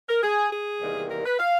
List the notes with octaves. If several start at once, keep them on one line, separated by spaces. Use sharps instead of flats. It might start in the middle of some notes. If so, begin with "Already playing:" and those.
A#4
G#4
G#4
E2 C3 D#3 G3 A#3
A#4
B4
F5